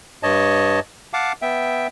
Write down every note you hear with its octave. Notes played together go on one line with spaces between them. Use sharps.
G2 C#5 D#5 A5
F5 F#5 A5 D6
B3 E5 G5